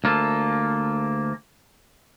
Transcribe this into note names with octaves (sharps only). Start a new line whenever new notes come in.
D2 A#3 F4 A4